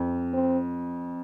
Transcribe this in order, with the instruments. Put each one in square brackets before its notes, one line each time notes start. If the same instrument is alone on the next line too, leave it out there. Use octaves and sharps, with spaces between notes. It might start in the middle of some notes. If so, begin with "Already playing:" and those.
Already playing: [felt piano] F2
[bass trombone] C4